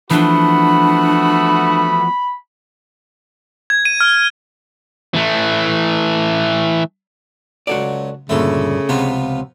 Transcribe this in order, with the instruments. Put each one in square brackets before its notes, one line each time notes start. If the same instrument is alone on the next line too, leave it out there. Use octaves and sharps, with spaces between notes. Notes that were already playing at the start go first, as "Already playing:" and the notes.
[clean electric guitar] E3 F3 [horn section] A3 B3 F#4 [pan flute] D4 [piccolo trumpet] B5
[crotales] G#6
D#7
F6
[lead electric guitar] E3 A3
[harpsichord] C#2 F#3 [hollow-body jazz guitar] F#4 A4 D5
[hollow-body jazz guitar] D2 G2 A#2 [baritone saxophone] C#3 [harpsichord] A3 A4
[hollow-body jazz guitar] C#2 C3 [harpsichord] F3 B3 F4